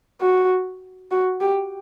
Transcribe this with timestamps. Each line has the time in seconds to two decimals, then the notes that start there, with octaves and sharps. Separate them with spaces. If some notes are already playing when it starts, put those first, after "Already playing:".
0.21 F#4
1.11 F#4
1.41 G4